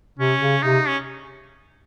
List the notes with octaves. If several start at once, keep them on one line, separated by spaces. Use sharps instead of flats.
C3 C#4
C#3
C3 D#4
C#4